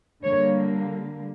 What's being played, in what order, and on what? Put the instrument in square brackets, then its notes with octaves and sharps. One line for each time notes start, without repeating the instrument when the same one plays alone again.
[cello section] D3 G3 A#3 C#5